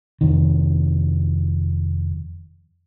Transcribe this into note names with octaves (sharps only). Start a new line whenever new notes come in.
F1 F2 D#3